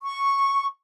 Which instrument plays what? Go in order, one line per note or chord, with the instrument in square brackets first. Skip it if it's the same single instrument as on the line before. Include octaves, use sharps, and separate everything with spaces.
[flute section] C#6